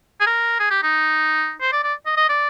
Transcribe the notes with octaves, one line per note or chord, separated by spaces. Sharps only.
G#4
A#4
G#4
G4
D#4
C5
D5
D5
D#5
D#5
D5